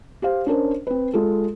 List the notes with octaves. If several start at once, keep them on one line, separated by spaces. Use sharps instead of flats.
G4 C5 F5
C#4 D4 A#4 C5
C4 B4
G#3 F4 A4